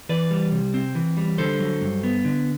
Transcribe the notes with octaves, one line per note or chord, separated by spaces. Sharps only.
E3 B4 D5
G3
C3
C4
E3
G3
D3 A4 C5
F#3
G2
B3
D3